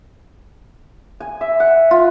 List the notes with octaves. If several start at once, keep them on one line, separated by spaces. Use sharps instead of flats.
G#5
E5
F#5
F4